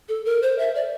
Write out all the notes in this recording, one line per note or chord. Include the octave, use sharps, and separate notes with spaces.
A4
A#4
C5
E5
D5